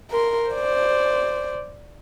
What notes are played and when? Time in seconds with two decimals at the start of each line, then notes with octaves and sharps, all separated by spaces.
0.11 A#4 C6
0.51 C5 D5